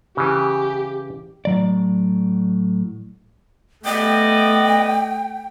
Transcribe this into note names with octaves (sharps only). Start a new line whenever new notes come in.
C#3 E3 G4
A2 F#3 D5
A3 B3 D5 D#5 G5